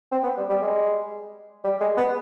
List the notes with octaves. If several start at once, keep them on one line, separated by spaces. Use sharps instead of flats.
C4
B3
G3
G3
G#3
G3
G#3
B3